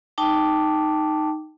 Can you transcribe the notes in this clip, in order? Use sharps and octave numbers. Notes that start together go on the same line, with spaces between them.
D#4 G5 A5 D6